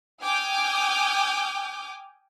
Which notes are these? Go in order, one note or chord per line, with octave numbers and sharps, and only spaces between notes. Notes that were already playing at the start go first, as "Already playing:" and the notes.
G5 G#5 D6 D#6 F6 G6